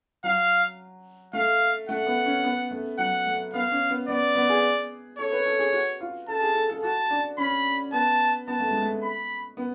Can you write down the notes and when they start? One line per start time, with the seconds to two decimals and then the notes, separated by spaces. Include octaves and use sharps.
0.24 F#3 F5
1.33 A3 F5
1.89 A3 F#5
2.06 B3
2.25 C#4
2.44 B3
2.71 A3
2.98 F#3 F#5
3.26 A3
3.53 B3 F5
3.72 C#4
3.90 B3
4.08 B3 D5
4.35 B3
4.49 G#4
5.18 A4 C#5
5.32 B4
5.46 A4
5.59 G#4
5.73 F#4
6.01 F4
6.28 A4 A5
6.41 G#4
6.55 A4
6.69 A4
6.83 F#4 A5
7.10 D4
7.38 C#4 B5
7.93 B3 A5
8.48 B3 A5
8.60 A3
8.71 G#3
8.82 A3
9.03 B5
9.57 B3